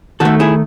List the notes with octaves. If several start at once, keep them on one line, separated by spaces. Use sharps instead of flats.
D#3 A3 F#4 A4
E4 G#4